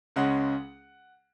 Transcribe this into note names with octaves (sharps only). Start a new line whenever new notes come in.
C#2 C#3 G#3 C#4 F#5